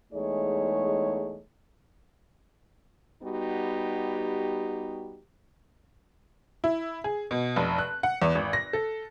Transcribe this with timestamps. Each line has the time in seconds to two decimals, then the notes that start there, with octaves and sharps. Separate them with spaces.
0.13 E2 G#3 A3 D#4 G#4 C#5
3.23 G3 B3 D#4 F#4 G4
6.64 E4
7.04 G#4
7.31 B2
7.56 F1
7.78 F#6
8.03 F#5
8.22 E2
8.35 G#1
8.53 A#6
8.73 A4